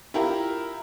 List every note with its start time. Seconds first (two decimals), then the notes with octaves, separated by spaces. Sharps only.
0.14 E4 F4 G4 A#4